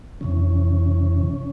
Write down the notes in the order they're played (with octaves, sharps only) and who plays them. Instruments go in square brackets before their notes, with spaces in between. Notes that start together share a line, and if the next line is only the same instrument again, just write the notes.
[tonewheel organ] F2 C3 E3 C#4